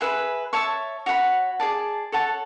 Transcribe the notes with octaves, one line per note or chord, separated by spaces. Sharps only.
G#4 B4 E5 B5
C#5 E5 A5 C#6
F#4 C#5 F#5 B5
G#4 D5 A5
A4 C#5 F#5 A5